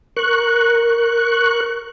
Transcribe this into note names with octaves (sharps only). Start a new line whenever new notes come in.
A#4 C#6 F#6